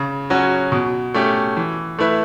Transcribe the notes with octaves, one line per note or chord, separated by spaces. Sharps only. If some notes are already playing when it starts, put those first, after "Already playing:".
Already playing: C#3
F#3 C#4 F#4
B2
A3 C#4 G4
E3
A3 E4 B4